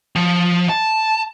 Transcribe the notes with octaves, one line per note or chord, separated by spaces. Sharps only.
F3
A5